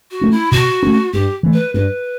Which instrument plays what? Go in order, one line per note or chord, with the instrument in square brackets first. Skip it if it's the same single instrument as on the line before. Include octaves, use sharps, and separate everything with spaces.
[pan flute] F#4
[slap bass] A3 C#4
[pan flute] E4
[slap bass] B2 [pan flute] F#4
[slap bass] A3 C#4
[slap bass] G2 [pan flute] G4
[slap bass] E3 A3
[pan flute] B4
[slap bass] G2 [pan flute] B4